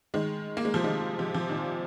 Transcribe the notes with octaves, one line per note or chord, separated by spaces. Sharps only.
D#3 G#3
A#3
G#3
C3 F3
D#3 G#3
C3 F3
C3 F3
A#2 D#3